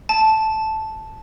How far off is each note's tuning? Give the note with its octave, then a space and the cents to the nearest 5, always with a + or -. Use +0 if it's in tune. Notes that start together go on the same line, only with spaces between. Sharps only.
A5 -5